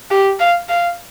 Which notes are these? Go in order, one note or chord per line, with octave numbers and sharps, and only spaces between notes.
G4
F5
F5